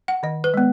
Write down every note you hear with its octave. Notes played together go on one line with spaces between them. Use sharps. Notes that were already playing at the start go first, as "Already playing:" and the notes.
F#5
D#3 D#5
B4
G#3 B3